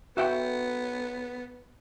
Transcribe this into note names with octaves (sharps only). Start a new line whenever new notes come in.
B3 F#4 E5 G5